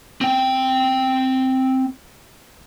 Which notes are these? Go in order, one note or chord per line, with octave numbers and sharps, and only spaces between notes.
C4 G5